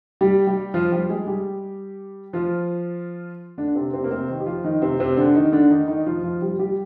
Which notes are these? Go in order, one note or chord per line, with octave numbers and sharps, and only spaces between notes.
G3 G4
G3 G4
F3 F4
G3 G4
G#3 G#4
G3 G4
F3 F4
D3 D4
C3 C4
C3 C4
A#3
C3 C4
D#3 D#4
G4
F3 F4
D#3 D#4
C3 C4
C3 C4
D3 D4
D#3 D#4
D3 D4
D#3 D#4
D#3 D#4
F3 F4
F3 F4
G3 G4
G3 G4